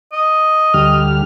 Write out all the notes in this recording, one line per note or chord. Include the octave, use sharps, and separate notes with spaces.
D#5
D2 G3 F6